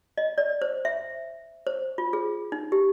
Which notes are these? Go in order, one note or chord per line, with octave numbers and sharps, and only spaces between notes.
D#5
D5
C5
E5
C5
F4
G#4
D#4
G4